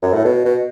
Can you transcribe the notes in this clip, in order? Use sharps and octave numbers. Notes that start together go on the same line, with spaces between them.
F#2
A2
B2
B2